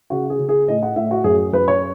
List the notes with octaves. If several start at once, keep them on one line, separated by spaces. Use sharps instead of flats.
C#3 F#4
G#4
C#3
G#4
A2 D#5
F#5
A2 E5
F#4
F#2 G#4
F#2 B4
C#5